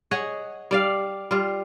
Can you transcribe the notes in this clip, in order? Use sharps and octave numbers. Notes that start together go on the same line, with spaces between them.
G#4 C#5 D#5 F#5
G3 D5 F5
G3 F4